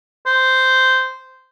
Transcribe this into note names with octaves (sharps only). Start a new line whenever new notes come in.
C5